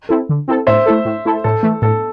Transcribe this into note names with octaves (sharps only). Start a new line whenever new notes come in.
C4 E4 A4
D3
C4 E4 A4
A2 C5 E5
A3 E4 A4
A2
A3 E4 A4
A2 A4
E3 A3
A2 A4